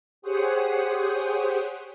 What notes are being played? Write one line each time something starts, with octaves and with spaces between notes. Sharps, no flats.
G4 G#4 C5 C#5 F#5 D#6